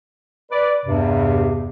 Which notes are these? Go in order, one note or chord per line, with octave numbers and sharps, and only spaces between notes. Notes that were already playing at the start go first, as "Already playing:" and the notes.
B4 D5
E2 G2 C3